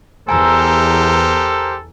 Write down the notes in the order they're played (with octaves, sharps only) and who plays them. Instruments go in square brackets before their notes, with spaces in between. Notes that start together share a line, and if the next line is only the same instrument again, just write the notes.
[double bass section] E2 [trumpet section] G4 A#4 C5 [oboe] A4 [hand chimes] G#5 A#5 E6